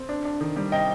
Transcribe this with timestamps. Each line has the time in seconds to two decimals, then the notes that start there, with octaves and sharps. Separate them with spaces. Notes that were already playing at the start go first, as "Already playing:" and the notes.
Already playing: C4
0.09 D4
0.25 D4
0.41 D#3
0.56 G3
0.72 C3 D#5 G5